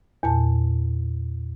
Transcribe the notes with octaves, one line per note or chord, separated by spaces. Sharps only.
E2 A#2 A5